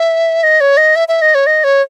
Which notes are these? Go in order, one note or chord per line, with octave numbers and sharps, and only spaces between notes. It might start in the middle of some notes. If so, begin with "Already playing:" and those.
Already playing: E5
D#5
C#5
D#5
E5
E5
D#5
C#5
D#5
C#5